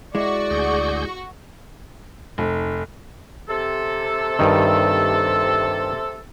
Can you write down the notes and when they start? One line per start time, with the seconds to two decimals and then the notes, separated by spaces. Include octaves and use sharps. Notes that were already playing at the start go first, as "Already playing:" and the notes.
0.15 G#3 E4 F#4 D5 C#6
0.50 D2 G#4 G6
2.38 F1
3.49 C3 A4
4.39 G2 D#3